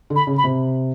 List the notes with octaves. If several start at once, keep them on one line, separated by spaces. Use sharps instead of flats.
D3
B5
C#3
B5
C3